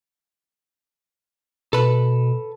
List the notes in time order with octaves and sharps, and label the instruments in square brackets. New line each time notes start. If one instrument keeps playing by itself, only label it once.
[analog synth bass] B2 [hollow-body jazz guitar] A4 B4